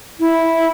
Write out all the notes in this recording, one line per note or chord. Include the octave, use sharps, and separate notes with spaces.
E4